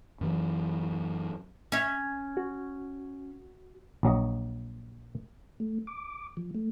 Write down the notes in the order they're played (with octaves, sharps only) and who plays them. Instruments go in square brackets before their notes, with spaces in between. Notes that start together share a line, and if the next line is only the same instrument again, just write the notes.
[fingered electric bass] F#2 E3 F#3
[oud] C#4 E5
[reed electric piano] F#4
[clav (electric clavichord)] A#1 F#3 D#5
[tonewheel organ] A3
D6
F3
A3